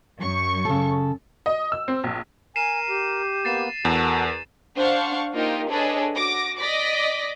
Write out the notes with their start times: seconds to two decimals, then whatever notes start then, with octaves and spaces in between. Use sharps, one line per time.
0.18 F#2 C#6
0.65 C#3 A4
1.46 D#5
1.72 E6
1.88 C4
2.04 A#1
2.56 A#4 G#5 C7 D#7 E7
2.88 G4
3.45 A#3 B3 A6 C7 E7
3.85 E2 F#4 A4 A#4
4.76 D4 C5 F5 F#5 C#6
5.34 A#3 D#4 F4 G4 A#4
5.70 D4 G#4 A4 B4 C#5 D#5
6.14 F#4 D6 A#6
6.59 D5 D#5 D6 A#6 B6